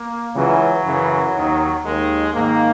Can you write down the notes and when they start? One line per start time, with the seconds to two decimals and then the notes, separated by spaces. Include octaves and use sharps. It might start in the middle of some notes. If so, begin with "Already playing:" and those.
Already playing: A#3
0.34 C#2 C#3 E3 F#3
0.84 F#2 C#3 E3
1.34 D#2 D#3
1.84 D#2 D#3 G#3
2.34 G#2 D#3 A#3